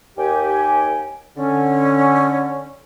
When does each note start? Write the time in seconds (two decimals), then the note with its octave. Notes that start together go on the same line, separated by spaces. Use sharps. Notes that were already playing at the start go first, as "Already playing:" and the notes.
0.18 D#2 G4 G5 G#5
1.37 D3 C#4